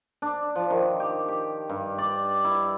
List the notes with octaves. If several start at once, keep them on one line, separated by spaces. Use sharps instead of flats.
D4
F3
D#3
G4
G4
G2
D5
E4